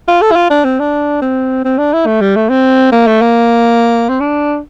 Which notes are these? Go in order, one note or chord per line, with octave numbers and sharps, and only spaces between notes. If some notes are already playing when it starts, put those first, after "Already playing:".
F4
A4
E4
F4
D4
C4
D4
C4
C4
D4
E4
A3
G3
A3
C4
A#3
A3
A#3
C4
D4